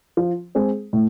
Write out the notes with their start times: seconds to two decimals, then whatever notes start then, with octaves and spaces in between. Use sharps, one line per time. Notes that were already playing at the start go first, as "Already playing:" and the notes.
0.17 F3
0.55 G#3 C4 G#4
0.93 A2